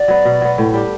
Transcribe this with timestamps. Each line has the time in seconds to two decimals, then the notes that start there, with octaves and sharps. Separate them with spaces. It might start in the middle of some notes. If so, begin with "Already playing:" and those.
Already playing: F#4 D5
0.08 F#3 B3
0.25 B2
0.41 F#3 B3
0.58 A2
0.74 G3 D4 G4